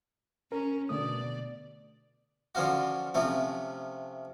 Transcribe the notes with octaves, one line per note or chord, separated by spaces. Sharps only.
C#4 A#4
B2 D3 A3 D5 D#6
D3 F3 C#4 F4 F#4
C3 F3 A3 C#4